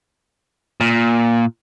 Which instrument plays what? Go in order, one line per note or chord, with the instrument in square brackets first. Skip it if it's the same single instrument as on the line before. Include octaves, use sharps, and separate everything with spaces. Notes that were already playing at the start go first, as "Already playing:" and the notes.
[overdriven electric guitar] A#2